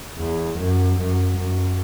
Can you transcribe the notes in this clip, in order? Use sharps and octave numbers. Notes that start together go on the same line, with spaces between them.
E2
F#2
F#2
F#2